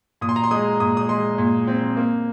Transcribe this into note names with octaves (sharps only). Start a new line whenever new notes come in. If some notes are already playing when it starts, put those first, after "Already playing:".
A#2 D#6
C6
A#5
C6
G#3 D#6
A#2 D#6
D#6
G#3 C6
A#2
C4
A#3